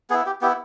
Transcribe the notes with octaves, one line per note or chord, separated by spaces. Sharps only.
B3 E4 G#4
G4
B3 E4 G4